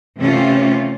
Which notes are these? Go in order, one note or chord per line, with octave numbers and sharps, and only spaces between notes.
C3 E3 A3 C#4 F4 G4